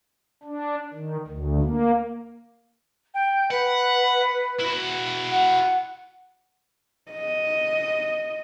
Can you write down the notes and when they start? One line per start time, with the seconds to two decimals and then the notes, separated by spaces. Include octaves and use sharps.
0.43 D4
0.93 D#3
1.27 D2
1.62 A#3
3.14 G5
3.51 B4 F#5
4.60 E4 F#4
5.31 F#5
7.12 D#5